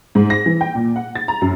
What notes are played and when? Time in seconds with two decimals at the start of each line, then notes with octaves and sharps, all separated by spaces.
0.15 G#2
0.30 A#6
0.46 E3
0.61 G5
0.75 A#2
0.96 F#5
1.15 A6
1.28 A#5
1.42 F#2